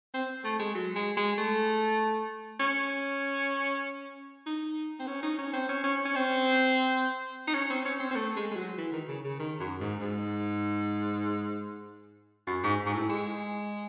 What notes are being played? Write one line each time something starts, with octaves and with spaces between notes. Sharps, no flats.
C4
A3
G#3
F#3
G#3
G#3
A3
C#4
D#4
C4
C#4
D#4
C#4
C4
C#4
C#4
C#4
C4
D#4
C#4
C4
C#4
C4
C4
A3
G#3
G#3
F#3
E3
D#3
C#3
C#3
D#3
F#2
G#2
G#2
F#2
G#2
G#2
A2
G#3